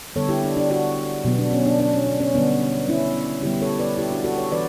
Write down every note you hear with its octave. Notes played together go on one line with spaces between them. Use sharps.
D3 G3 B3 A4 C#5
E4 G4
D4
D4
D4 F#4
B2 F#3 B3
D4
C#4
D4
D4
C#4
D4
C#4
D3 G3 B3 D4
C#4 E4
D3 G3 B3 E4 G4
A4 C#5
B4 D5
E4 G4
D4 F#4
F#4 A4
A4 C#5
E3 B4 D5